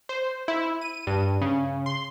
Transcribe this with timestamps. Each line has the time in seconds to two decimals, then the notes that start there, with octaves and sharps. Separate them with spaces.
0.09 C5
0.48 E4
0.81 D#7
1.07 G2
1.41 C#3
1.86 C6